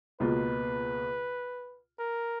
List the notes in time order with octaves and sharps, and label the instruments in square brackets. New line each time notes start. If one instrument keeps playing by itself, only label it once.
[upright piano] C#2 B2 A#3 F4 [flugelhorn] B4
[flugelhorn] A#4